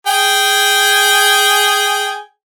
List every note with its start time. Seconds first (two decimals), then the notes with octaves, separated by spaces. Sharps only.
0.07 G#4 G5 G#5